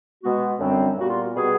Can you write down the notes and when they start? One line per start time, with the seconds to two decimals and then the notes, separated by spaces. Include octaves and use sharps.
0.22 B2 G#3 B3 F#4
0.59 F#2 D3 G3 C4
0.97 A#2 G3 B3 F#4
1.09 F4
1.21 F#4
1.35 B2 G3 B3 G#4